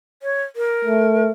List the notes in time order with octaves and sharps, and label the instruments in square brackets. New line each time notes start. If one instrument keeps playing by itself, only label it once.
[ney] C#5
A#4
[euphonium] A3